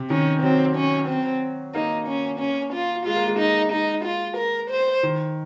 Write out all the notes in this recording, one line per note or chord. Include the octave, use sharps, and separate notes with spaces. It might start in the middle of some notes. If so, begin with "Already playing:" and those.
Already playing: C3
D#3 C#4
F#3 C4
C#4
C4
A#3 D#4
C#4
C#4
F4
G#3 F4
A#3
G#3
D#4
G#3 D#4
F4
A#4
C5
D#3